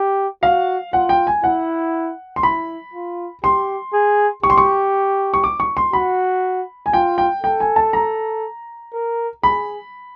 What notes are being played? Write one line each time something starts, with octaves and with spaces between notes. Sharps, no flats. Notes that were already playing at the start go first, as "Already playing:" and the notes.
Already playing: G4
F#4 F5
F4 F#5
G5
G#5
E4 F#5
C6
E4 B5
F4
G4 C6
G#4
G4 C#6
C6
C#6
C#6
D6
C#6
C6
F#4 B5
G#5
F4 G5
G5
A4 G5
G#5
A5
A#5
A#4
G#4 B5